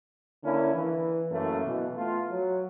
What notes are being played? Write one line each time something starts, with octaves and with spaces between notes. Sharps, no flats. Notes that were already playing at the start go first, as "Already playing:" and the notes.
D3 A#3 C#4 E4
E3
F#2 E3 A3 A#3
B2 E3
A3 B3 F4
F#3